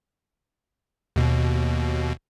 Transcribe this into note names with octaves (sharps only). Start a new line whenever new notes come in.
D#2 B2